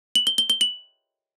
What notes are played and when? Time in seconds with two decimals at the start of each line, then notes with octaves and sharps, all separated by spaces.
0.15 F#7
0.27 G7
0.38 G7
0.50 G7
0.61 F#7